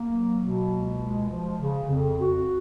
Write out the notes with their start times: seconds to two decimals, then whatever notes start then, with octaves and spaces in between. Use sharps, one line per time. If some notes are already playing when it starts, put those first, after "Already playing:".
Already playing: A#3
0.09 F#3
0.39 B2
0.69 C#2
1.00 G#3
1.29 F3
1.61 C#3
1.90 F2
2.20 F#4